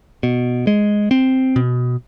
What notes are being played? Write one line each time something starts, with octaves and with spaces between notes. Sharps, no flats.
B2
G#3
C4
B2